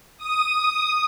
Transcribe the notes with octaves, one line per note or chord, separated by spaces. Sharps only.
D#6